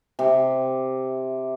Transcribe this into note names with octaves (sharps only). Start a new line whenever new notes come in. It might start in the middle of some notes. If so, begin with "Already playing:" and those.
C3